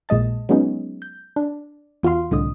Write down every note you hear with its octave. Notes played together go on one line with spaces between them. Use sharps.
A#1 A#2 G#3 D#5 A5
F#3 G#3 B3 C#4 D#4
G6
D4
E2 F4 F#4 F5 C6
C2 A2 D3 D#5 D#6